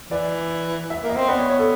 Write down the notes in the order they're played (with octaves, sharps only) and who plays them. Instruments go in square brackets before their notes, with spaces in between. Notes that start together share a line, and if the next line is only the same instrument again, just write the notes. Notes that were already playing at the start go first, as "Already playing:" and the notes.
[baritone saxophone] E3 [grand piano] D5
[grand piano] E5
[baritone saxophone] A#3
[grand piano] D#5
[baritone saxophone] C4
[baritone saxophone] B3 [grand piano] D5
[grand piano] C#5
C#5
A4